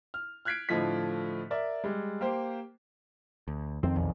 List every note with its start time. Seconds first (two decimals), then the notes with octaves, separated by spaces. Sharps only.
0.14 F6
0.45 F6 F#6 G#6 B6 C7 D7
0.69 A2 D3 F3 A3 D#5 B6
1.50 A#4 D5 E5
1.84 G3 G#3
2.21 A#3 G4 C5
3.48 D2
3.83 F2 D#3 C4
3.96 B1 E2